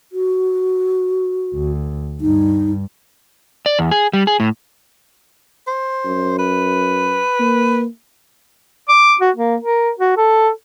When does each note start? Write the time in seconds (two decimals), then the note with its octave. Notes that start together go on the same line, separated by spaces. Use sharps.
0.12 F#4
1.54 D2
2.21 G2 D#4
3.66 D5
3.79 E2
3.91 G#4
4.13 G3
4.27 G#4
4.40 A2
5.67 C5
6.05 F#2
6.39 B4
7.40 A#3
8.89 D6
9.21 F#4
9.36 A#3
9.62 A#4
9.99 F#4
10.17 A4